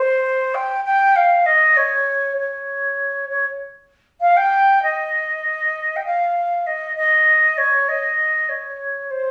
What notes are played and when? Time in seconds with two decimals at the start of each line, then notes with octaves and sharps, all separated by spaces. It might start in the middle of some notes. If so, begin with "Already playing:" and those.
Already playing: C5
0.54 G5
0.85 G5
1.16 F5
1.46 D#5
1.76 C#5
2.37 C#5
3.29 C#5
4.21 F5
4.36 G5
4.82 D#5
5.96 G5
6.05 F5
6.66 D#5
6.96 D#5
7.57 C#5
7.88 D#5
8.49 C#5
9.10 C5